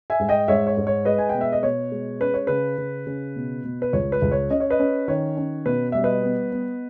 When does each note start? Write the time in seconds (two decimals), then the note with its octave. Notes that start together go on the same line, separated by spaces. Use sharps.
0.10 E5 G#5
0.19 G#2
0.29 D#5 G5
0.48 G#2 C#5 E5
0.67 C#5
0.77 G#2
0.87 C#5
1.05 G#3 B4 D#5
1.18 G#5
1.29 B2 G5
1.41 E5
1.52 D#5
1.63 B2 C#5
1.92 G#3
2.20 C#4 B4
2.34 C#5
2.47 C#3 B4
2.78 C#3
3.07 C#3
3.36 B2
3.65 B2
3.82 B4
3.93 C#2 C#5
4.12 B4
4.22 C#2
4.32 C#5
4.50 C#4 D#5
4.60 C#5
4.70 B4 D#5
4.80 C#4
5.08 D#3 C#5
5.37 C#4
5.66 B2 B4
5.92 G3 E5
6.04 B4 D#5
6.23 B3
6.52 B3